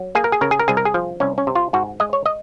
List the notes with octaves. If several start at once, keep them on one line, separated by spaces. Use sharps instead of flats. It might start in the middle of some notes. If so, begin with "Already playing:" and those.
Already playing: F#3
A#3 G#4
A#4
G#4
C#3 A#4
G#4
A#4
C2 G#4
A#4
G#4
F3
C2 C#4
C#4
C3
F4
G#2 F#4
G#3 D#5
C#5
D#5